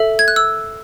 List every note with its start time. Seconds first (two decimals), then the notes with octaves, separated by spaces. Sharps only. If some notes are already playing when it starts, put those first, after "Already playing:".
Already playing: A4 E5
0.19 G#6
0.28 F#6
0.36 E6